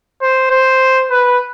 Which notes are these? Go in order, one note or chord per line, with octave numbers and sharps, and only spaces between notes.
C5
C5
B4